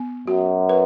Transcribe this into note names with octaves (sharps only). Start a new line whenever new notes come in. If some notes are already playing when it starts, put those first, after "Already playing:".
Already playing: B3
F#2 F#4
B4